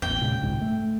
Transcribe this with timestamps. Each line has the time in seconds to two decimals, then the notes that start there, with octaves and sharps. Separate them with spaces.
0.02 A1 E2 G5
0.21 A#2 C#3 G#3
0.42 C2 G#2 D3
0.61 A3